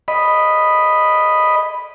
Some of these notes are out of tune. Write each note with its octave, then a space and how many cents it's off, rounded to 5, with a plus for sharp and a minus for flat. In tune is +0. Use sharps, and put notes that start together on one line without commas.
D#5 -5 B5 +0